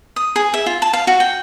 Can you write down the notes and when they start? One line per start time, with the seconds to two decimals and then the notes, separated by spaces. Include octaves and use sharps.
0.16 D#6
0.36 G#4
0.54 E5
0.66 F4
0.82 A5
0.93 F5
1.07 F#4
1.20 G5